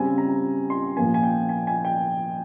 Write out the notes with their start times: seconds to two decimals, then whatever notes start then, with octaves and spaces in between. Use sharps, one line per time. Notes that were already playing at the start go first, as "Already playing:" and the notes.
Already playing: C#3 G3 C4 G#5
0.18 A#5
0.70 C6
0.97 A#2 F3 A#3 G#5
1.14 G#5
1.23 G5
1.49 G#5
1.67 G#5
1.85 G5